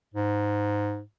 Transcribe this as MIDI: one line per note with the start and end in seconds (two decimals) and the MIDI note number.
0.14 1.02 44